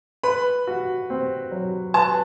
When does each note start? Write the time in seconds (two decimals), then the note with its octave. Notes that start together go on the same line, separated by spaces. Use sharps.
0.23 B4 B5
0.67 F#4
1.10 C4
1.52 F#3
1.94 B4 A5